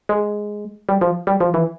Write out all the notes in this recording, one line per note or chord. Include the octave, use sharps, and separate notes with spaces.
G#3
G3
F3
G3
F3
E3